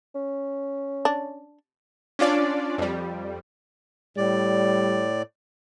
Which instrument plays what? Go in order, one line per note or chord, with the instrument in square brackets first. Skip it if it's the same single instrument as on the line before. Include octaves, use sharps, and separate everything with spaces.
[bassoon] C#4
[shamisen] D4
[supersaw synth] C#4 D4 F4 D5
F2 G3
[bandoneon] A2 D5 [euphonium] G3